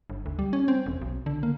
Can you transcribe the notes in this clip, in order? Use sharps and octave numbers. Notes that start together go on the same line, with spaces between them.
G1
D2
G3
C#4
C4
E1
B1
D3
A#3